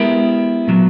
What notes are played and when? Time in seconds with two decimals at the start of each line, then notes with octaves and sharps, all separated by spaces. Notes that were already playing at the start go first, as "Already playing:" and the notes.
Already playing: G#3 B3 E4 G4 A#4
0.68 A#2 F#3 B3